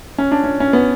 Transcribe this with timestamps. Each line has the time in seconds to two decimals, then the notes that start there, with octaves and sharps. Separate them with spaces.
0.18 C#4
0.32 D4
0.44 C#4
0.60 C#4
0.73 B3